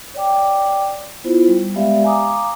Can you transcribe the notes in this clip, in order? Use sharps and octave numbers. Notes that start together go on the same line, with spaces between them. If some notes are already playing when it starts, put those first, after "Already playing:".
C#5 D5 G5 D6
B3 E4 F4 C5
G3
G#3 B3 G4 D5 E5 F5
F5 G#5 A#5 D6 D#6